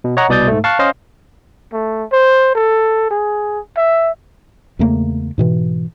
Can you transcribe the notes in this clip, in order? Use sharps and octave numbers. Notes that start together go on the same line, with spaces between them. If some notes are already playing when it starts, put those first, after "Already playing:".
B2
C#5 D#5 F#5 A#5 C#6
C2 B2 D5 D#6 G6 A6
G#2 A3
F5 A5 C#6 F#6
C#4 C5 D#5 F5
A3
C5
A4
G#4
E5
E2 C#3 A3 A#3
G#2 B2 E3